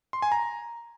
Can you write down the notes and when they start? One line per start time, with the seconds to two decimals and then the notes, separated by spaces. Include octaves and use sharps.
0.13 C6
0.22 G#5
0.32 A#5